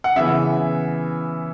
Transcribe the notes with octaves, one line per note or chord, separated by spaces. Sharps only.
F#5
C#3 E3 B3 E5